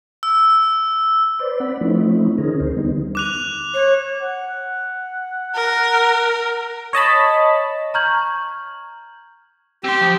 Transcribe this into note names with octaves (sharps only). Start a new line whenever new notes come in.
E6
B4 C5 D5
C4 D5 F#5 B5
F3 A3 C4 C#4 D#4 E4
D3 C4 C#4 D#4 G#4 A#4
D2 C5
D3 G3 B3 D#4
D6 F#6 F7
C#5
F#5
A#4
C#5 D#5 A5 B5
A#5 C#6 F6 G6 G#6 F#7
C4 G4 C6
F3